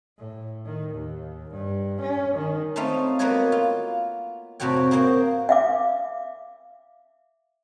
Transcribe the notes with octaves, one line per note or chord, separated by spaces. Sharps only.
A2
D#3
D#2
G2
C#4
D#3
A3 C4 C#4 D#4 F4 F5
A#3 B3 F#4 B4 C#5 D#5
F4
F2 A2 C3 F#4 C#5 G5
A#3 F#4 G#4 C5 G5
E5 F5 D6